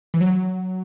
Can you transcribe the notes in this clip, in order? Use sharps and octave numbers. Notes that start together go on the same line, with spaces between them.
E3
F#3